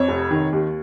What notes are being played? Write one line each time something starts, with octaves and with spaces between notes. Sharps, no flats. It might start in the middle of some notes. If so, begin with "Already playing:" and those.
Already playing: F2 C#5
F1
D#3
D#2